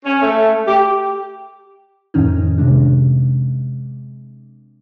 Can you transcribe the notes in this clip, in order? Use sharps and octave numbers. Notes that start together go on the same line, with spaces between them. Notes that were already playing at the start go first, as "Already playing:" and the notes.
C#4
A3
G4
F2 A2 D#3 C#4 D#4
C3 G#3 D4